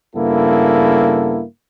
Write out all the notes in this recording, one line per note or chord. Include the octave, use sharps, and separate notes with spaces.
G2 C#3 A#3 B3 E4 A4